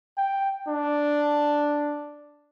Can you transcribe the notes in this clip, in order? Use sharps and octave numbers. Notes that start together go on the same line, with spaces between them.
G5
D4